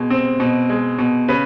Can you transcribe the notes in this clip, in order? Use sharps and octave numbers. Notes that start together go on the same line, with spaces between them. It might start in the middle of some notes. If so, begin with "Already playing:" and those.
Already playing: B2 G#3
C4
B2
G#3
B2
C#3 B4